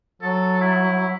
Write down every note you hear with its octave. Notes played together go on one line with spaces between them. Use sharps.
F#3 A4
E4